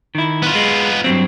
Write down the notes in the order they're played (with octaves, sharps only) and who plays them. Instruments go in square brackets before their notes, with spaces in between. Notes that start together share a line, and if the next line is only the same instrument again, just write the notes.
[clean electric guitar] D#3 E4
[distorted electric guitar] B3 F4
[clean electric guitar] G#3
G2 F#3 C4